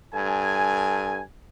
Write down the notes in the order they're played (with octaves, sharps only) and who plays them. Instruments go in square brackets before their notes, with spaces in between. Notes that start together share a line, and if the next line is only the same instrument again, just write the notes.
[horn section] G2 A4 G#5